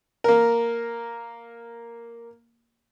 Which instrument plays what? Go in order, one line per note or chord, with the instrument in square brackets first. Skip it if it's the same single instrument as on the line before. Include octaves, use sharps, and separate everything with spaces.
[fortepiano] A#3 A#4